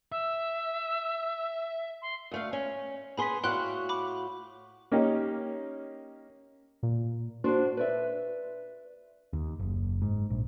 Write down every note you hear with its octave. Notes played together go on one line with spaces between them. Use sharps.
E5 E6
C6
D2 A3 F5
C#4
B3 G#4 B5 C6 B6
A2 F#4 F5 G5 C6 F#6
B5 D6
A#3 C#4 D#4 G4
A#2
D4 F4 F#4 C5
B4 D5 E5
D#2
F#1
G#2
A#1